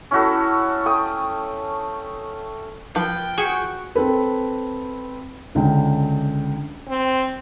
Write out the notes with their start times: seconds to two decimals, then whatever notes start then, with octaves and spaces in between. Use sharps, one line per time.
0.11 C#4 E4 F#4 A4
0.86 A3 G5 D#6
2.96 F3 B4 G5
3.38 F#4 G#4 C#6
3.95 C4 A4 B4
5.55 C#2 D3 G5
6.89 C4